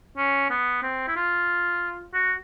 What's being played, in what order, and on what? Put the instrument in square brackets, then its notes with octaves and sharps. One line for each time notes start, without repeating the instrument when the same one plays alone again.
[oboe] C#4
B3
C4
E4
F4
F#4